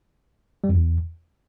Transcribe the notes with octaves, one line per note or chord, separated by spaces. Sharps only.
G3
F2
E2